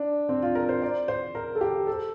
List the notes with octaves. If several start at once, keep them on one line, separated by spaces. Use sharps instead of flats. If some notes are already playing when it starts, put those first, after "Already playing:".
Already playing: D4
C4
F4
A#4
C5
D5
C5
A#4
A4
G4
A4